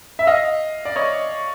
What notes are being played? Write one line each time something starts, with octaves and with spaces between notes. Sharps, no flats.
E5
D#5 F5
D5
C#5 D#5